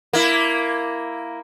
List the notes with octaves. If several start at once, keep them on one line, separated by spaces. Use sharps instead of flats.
A#3 E4